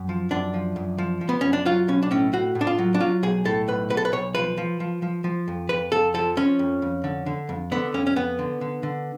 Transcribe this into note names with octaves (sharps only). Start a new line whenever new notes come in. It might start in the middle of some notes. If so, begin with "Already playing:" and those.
Already playing: F#2
F3
F#2 D4
F3
F#2
F3
F3
B3
F#2 C#4
D4
F#3 F4
B1 C#4
D4
A2 C#4
A2 F#4
A2
D4
F4
F#3
D4
F#3 F4
B1 G#4
A2 A4
B1 B4
B1 B4
A4
B4
B1 C#5
F3 B4
F3
F3
F3
F3
F2
F2 B4
F2 A4
F3 A4
F3 C#4
F2
F2
D3
D3
F2
D3 B3
F2 C#4
C#4
F2 B3
D3
D3
D3